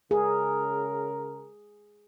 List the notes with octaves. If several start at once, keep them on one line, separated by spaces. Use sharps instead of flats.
C#3 G#4 A#4